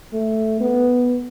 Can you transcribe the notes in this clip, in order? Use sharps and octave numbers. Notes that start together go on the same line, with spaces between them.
A3
B3